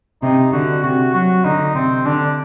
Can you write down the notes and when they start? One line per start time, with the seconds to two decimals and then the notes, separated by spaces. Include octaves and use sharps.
0.22 C3 D#4
0.53 D3 F#4
0.83 C3 F#4
1.14 F#3 F#4
1.44 D3 D#4
1.75 C3 C4
2.05 D3 D4